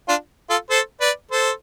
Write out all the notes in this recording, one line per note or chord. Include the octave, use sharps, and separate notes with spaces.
D4 F4
F4 A4
A4 C5
B4 D5
A4 C5